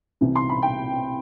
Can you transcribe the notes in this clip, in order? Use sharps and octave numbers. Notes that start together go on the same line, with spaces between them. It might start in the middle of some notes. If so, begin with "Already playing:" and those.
C2 C3 E3
C6
B5
G5